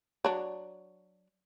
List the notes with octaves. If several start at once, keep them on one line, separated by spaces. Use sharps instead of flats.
F#3 D4